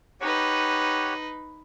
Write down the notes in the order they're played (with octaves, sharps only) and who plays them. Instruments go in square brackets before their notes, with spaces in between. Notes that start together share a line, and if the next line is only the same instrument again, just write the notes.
[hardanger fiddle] D#4 B4 [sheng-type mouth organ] G4 C#5 F#5